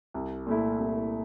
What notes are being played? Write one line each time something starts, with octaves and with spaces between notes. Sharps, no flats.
C2
A#2 A3 E4
C2